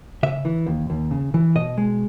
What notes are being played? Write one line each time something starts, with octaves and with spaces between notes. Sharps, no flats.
C#3 E5
E3
D#2
D#2
C#3
E3
B2 D#5
G#3